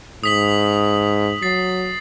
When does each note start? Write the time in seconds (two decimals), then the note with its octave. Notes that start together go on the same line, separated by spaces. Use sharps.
0.23 G#2 D#6 B6 F#7
1.42 F#3 A6 C7